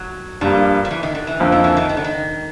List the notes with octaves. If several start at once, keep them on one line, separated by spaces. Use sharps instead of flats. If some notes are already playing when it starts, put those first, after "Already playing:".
Already playing: F#3
G2 D3 F3 G3 A#3
F3
E3
D#3
D3
E3
F2 D3 F3 A#3
D#3
E3
D#3
D#3
D3
D#3